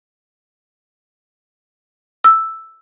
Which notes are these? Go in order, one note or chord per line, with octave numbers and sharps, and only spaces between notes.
E6